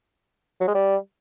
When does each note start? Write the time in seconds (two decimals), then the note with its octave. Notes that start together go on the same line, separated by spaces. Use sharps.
0.60 F#3
0.68 G#3
0.75 G3